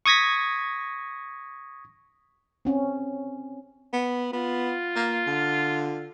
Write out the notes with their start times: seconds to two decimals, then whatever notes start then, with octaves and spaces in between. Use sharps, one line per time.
0.06 C#6 D#6 G#6 A#6 B6
2.65 C4 C#4
3.93 B3
4.33 B3 F4
4.96 A#3
5.27 D3